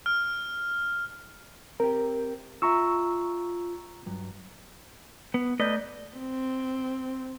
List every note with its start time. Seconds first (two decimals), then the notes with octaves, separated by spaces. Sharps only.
0.06 F6
1.80 C4 G4 A#4
2.62 F4 E5 A#5 C#6 E6
4.06 G2 F#3
5.34 B3
5.60 A3 A4 B4 D5 D#5 G6
6.19 C4